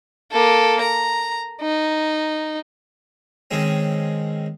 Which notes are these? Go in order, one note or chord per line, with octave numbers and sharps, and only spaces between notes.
A#3 A4
A#5
D#4
D#3 G#3 C4 C#4